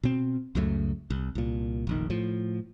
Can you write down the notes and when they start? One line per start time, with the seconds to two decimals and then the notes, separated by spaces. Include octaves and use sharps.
0.03 B2 C4
0.55 C#2 F#2 C#3 A3
1.10 C2
1.35 C2 A#2
1.87 F1 A#1 D#3
2.10 A2 F3